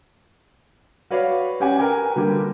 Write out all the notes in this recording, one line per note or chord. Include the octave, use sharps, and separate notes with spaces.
F#4 B4 C#5 D5 F5
C#4 G4 F#5 G#5
A#4 B4 G5 G#5
D3 G3 A#3 G4